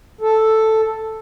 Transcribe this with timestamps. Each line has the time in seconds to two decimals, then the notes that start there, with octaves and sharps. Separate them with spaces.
0.21 A4